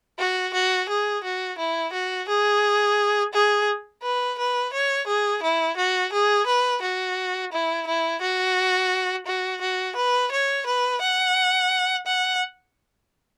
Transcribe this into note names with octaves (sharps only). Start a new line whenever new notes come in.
F#4
F#4
G#4
F#4
E4
F#4
G#4
G#4
B4
B4
C#5
G#4
E4
F#4
G#4
B4
F#4
E4
E4
F#4
F#4
F#4
B4
C#5
B4
F#5
F#5